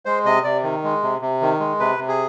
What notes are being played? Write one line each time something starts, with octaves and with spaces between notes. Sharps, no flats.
G#3 C5
C3 D#5
C3 D5
D#3
G#3
C3
C3
D#3
G#3
C3 B4
C3
G#4